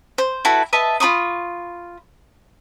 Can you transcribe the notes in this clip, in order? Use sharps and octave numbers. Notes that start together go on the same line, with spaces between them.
C5
E4 F#4 A4 B4
B4 D#5 E5 A5
F4 B5 C#6 D#6